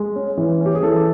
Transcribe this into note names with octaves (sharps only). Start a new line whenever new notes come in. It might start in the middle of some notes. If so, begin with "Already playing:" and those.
Already playing: G#3
C#4
E3
C#4
G4
G#4
E3 A4